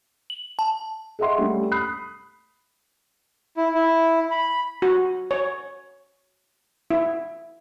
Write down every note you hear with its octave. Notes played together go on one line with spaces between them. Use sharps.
F#7
A5
G#4 D#5 E5 F#5 C6 C#6
G3 A3 C#4
B5 D#6 F#6 C7
E4
E4
B5
F#4
C#5
E4